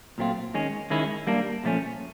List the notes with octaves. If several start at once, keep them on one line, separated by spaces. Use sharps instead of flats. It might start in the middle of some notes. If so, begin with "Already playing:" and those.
A#2 F#3 A3 C4 F4
D#3 G#3 C#4
D#3 G#3 C#4 E4
G3 A#3 D4
A#2 F3 A3 C#4